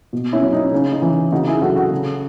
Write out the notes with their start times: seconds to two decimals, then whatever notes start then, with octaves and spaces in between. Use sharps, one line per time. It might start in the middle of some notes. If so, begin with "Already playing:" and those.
0.13 B2
0.33 C#4 E4
0.42 F#3
0.53 D#4
0.72 C#3 C#4
0.92 D#4
1.02 E3
1.32 C#3 D#4 F#4
1.47 E4 G#4
1.62 F#3 F#4 A4
1.76 F#4 A4
1.91 C#3